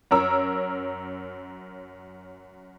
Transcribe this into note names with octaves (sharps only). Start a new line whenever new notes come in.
F#2 A#4 C#5 A#5 E6